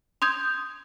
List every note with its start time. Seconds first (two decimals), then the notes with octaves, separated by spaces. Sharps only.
0.22 C6 D#6 G6 G#6